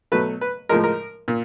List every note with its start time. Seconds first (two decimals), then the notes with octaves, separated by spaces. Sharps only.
0.12 B2 F#3 A3 B4
0.41 B4
0.69 A2 F3 G#3 A#4
0.84 A#4
1.28 A#2